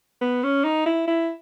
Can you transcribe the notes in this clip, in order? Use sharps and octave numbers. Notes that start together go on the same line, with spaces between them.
B3
C#4
D#4
E4
E4